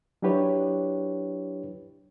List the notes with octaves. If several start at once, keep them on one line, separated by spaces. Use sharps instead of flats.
F#3 D4 E4 G4 B4 C#5